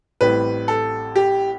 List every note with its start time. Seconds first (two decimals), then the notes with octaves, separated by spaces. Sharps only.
0.21 A1 A2 G3 C4 B4
0.68 A4
1.16 G4